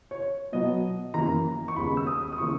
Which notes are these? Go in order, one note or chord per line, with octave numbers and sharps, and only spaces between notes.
C#5
B2 F#3 B3 D#5
F#2 E3 A#3 A#5
C#6
D#2 C#3 G#3 B3 B5
E6
D#6
D#6
C#3 E3 A#3 C#6